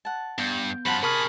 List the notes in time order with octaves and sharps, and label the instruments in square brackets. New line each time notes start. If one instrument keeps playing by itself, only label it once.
[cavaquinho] F#5 A5
[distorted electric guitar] G2 [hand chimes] B3 G6
[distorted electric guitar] F#2 F4 [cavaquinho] C5 F#5 A5 [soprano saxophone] B5
[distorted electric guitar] C3 G#4 [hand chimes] A#4 C#6 F6 [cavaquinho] A5 [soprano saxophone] B5